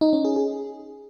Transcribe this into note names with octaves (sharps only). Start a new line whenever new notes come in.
D#4
C#4
G#4
G#4